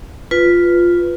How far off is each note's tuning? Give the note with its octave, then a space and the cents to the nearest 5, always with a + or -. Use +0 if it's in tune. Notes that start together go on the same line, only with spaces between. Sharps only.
F4 +0 B4 +0